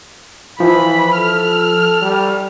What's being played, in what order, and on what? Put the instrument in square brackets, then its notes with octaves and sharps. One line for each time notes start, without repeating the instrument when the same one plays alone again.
[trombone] E3 [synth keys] F3 [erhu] B5
[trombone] A4 [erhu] F6
[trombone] G3